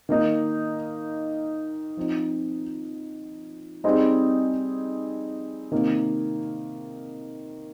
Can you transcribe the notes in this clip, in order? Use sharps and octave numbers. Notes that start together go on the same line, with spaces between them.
D#3 A#3 D#4
F3 C4 D#4
G3 C4 D#4 G#4 D#5
C3 D#3 A#3